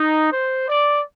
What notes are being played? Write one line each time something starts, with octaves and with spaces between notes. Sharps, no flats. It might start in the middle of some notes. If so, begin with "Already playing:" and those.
Already playing: D#4
C5
D5